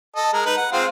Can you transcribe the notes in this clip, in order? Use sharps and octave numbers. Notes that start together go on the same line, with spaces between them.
A4 D#5
G#3 A#4
D#4 B4
F#5
G#3 C4 F4